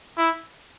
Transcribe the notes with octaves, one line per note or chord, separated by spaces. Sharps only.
E4